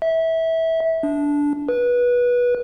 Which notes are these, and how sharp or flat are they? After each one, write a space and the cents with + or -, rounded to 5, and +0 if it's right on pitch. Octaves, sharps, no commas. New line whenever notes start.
E5 -20
D4 -15
B4 -20